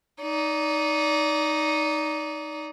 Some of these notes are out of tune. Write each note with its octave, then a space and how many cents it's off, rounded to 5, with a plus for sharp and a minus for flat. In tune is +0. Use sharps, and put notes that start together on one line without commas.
D#4 +0 D5 -25